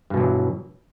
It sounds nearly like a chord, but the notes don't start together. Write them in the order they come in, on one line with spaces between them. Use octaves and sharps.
G2 B2 F#3 E3